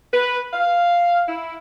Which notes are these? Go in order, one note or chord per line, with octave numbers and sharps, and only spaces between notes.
B4
F5
E4